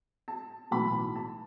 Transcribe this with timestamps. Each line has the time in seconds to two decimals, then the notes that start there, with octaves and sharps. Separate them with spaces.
0.28 A5
0.71 B1 A2 E3 B5
1.15 A5